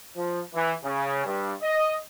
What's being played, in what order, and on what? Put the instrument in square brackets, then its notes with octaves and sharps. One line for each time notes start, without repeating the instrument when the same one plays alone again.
[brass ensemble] F3
E3
C#3
G2
D#5